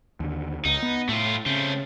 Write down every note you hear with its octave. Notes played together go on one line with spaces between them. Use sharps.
D#2 D3
C#2 C#3 D#4
B3
A2 A3 F4
C#3 A3 C4